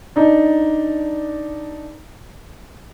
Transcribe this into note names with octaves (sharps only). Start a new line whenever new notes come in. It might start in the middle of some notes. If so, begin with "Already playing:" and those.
D4 D#4